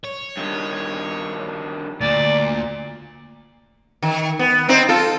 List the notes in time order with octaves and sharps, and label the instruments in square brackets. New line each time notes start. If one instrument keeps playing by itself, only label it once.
[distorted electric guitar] C#5
[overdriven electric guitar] G2 D#3
[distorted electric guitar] D2 [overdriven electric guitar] A#2 [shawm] D5
[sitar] D#3
B3
C4 D#4 C5
F4 A4